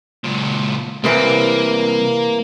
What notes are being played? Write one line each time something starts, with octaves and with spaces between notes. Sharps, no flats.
C#2 A#2
C2 C3 E3 A#3 G4